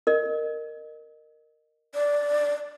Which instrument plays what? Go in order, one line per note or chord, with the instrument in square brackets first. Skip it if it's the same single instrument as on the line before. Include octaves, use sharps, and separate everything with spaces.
[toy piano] A#4 D#5
[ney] D5